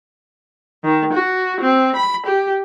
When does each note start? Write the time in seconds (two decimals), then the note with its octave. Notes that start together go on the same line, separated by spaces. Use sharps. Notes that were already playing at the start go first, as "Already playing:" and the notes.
0.84 D#3
1.12 F#4
1.59 C4
1.95 B5
2.26 G4